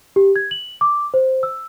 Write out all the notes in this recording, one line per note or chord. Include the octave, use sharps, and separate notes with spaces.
G4
G#6
F#7
D6
C5
E6